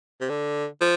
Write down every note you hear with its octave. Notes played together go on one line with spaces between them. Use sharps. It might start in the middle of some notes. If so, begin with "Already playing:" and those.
C3
D3
F3